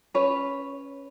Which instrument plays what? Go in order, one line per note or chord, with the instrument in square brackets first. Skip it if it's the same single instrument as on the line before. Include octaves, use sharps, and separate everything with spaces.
[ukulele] C#4 B4 C#5